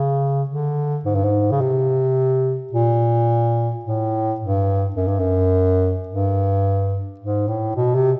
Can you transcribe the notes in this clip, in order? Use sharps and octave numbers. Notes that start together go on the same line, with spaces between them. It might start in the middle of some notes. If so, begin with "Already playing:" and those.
Already playing: C#3
D3
G#2
G2
G#2
C#3
C3
A#2
A2
G2
F#2
G2
F#2
G2
G#2
A2
B2
C3